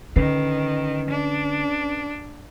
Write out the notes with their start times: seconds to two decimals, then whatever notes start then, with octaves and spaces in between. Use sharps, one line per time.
0.16 D3 D#3 C#4 B4 C7
1.10 D4